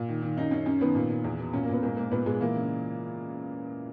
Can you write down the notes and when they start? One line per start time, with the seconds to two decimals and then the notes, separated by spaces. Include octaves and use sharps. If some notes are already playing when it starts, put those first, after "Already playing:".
Already playing: A#2
0.09 D#3
0.23 D#3
0.37 F#2 D#4
0.51 F#2 C#4
0.66 F#2 C#4
0.81 D#3 B3
0.95 A#2
1.10 A#2
1.24 E2
1.39 B2
1.53 A#2 C#4
1.63 A#3
1.68 A#2 B3
1.83 G#2 A#3
1.97 G#2 A#3
2.11 A#2 B3
2.26 A#2 G#3
2.40 E3 A#3
2.56 C#3